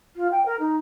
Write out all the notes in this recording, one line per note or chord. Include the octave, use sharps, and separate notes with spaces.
F4
G5
A#4
D#4